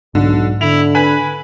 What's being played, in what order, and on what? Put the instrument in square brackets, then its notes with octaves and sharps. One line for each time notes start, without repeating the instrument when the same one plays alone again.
[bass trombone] B1 [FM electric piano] G#2 [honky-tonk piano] D3
[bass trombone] D3 [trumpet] E4 [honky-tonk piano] F7
[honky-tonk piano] B4 G#5 [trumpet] B5 [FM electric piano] F#6